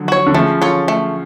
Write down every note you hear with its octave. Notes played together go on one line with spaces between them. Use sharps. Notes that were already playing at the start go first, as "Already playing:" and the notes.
Already playing: D3 F3 F#3
F#4 C#5
D3
C#3 F3 A3
F4 A4 C#5
A3